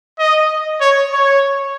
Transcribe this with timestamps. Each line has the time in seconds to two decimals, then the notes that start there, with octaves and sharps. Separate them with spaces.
0.19 D#5
0.81 C#5
1.13 C#5